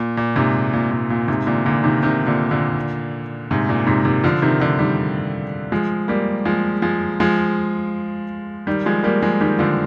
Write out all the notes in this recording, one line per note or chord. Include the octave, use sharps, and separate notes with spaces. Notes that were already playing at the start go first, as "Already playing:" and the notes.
Already playing: A#2
A#2
G#2 C3
A#2
A#2
A#2
G#2 C3
A#2 D3
A#2 D3
C3 D#3
C3 D#3
A#2 D3
A#2 D3
G#2 C3
A#2
G#2 C3
C3 D#3
D3 F3
C3 D#3
D3 F3
D#3 G3
F3 G#3
G3 A#3
F3 G#3
F3 G#3
F3 G#3
D#3 G3
F3 G#3
G3 A#3
F3 G#3
D#3 G3
D3 F3